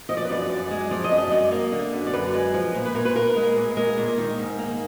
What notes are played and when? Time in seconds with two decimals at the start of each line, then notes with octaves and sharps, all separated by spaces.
0.09 F3 D#5
0.17 D5
0.25 B4
0.29 F#2 D5
0.49 F#2 D5
0.70 G#3
0.91 F3 D5
1.04 D#5
1.11 F#2
1.18 D#5
1.31 F#2 D5
1.52 A#3
1.72 D3
1.93 F#2
2.07 D5
2.13 F#2 B4
2.34 G#3
2.54 F3
2.75 A#2
2.85 B4
2.95 A#2 A#4
3.05 B4
3.15 A#3 A#4
3.36 G#3
3.56 A#2
3.77 G#3 A#4
3.97 A#2
4.18 D#3
4.38 G#2
4.59 A#3